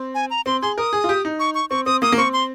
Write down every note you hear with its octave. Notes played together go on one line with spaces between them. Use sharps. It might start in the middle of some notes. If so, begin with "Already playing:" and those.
Already playing: C4
G#5
A#5
C4 C6
G#4 C6
A#4 D#6
G#4
F4
G4
D#4
C#6
C#6
C4 C#6
C4 D#6
A#3 D#6
A#3
C4 C#6
C6